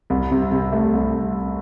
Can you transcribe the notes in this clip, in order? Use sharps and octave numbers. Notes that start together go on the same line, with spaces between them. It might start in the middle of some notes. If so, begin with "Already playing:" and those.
C2
C3
C3
A3
C2